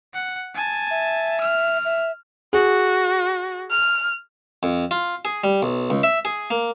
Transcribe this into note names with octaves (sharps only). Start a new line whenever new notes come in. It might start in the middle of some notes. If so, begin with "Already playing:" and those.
F#5
G#5 A5
E5
F6
E5
F#4 G#4
F6
F2
F4
G#4
G3
B1
C#2
E5
G#4
A#3